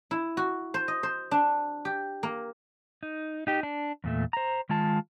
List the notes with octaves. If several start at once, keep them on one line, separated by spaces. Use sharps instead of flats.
E4
F#4
C5
D#5
C5
D4
G4
A#3
D#4
D#4 G4
D4
E2 A#2 A3
C5 A#5
D#3 G#3 F4 A5